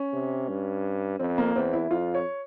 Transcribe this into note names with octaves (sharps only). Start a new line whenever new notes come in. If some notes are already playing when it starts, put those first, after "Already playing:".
Already playing: C#4
C3
G2
F2 C4
A#3
E2 C4
E4
F2 F4
C#5